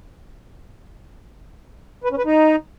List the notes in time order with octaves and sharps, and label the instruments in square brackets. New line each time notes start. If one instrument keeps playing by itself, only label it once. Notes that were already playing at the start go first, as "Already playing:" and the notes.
[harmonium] B4
C#4
B4
D#4